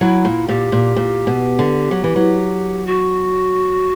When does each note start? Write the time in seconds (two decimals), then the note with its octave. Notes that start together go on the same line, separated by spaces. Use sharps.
0.01 F#3 E4
0.25 A#2
0.48 A#2 G4
0.72 A#2
0.96 A#2
1.27 B2
1.59 D3
1.91 F#3
2.04 E3
2.16 F#3
2.86 F#4